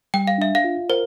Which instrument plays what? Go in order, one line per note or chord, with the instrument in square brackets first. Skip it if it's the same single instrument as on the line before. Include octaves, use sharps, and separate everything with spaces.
[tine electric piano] G3 [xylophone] G5
[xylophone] F5
[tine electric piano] D4 [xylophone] E5
[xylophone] F5
[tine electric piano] F4
[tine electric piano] A#4 [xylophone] C5